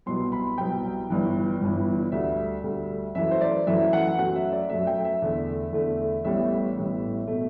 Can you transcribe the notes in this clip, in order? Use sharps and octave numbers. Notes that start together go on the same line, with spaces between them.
C2 B2 F#3 B3 C6
B5
C2 B2 F#3 B3 G5
G1 G2 E3 B3
G1 G2 E3 B3
D2 D3 G3 E5
D2 D3 G3
F#2 E3 A3 E5
C5
D5
F#2 E3 A3 E5
F#5
F#2 F#3 A3 F#5
E5
D5
F#2 F#3 A3 E5
G5
E5
E2 D3 A3
E2 D3 A3
A1 A2 G3 B3 E5
A1 A2 G3 B3
B2 A3